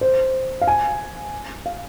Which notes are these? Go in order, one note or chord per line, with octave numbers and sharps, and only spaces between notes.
C5
F5
G#5
F5